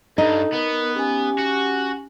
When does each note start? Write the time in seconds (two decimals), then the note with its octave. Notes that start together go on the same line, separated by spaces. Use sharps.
0.18 G2 D#4 A4
0.53 B3 A#4
0.96 C#4 G4 G#5
1.38 F#4